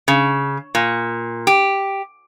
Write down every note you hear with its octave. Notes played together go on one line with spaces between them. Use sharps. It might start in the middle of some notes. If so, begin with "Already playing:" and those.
C#3
A#2
G4